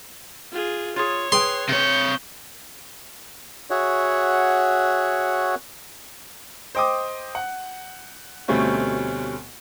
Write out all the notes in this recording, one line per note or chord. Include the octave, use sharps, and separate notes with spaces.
F4 G#4
F4 G#4 C#5
G#4 B4 G5 C6
C3 C#5 G6
F#4 G#4 C#5 E5 F#5
C5 D#5 G5 D6 D#6
F#5
D2 B2 G3 A3 C4 C#4